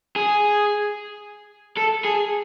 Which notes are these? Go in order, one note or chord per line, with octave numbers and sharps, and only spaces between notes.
G#4
A4
G#4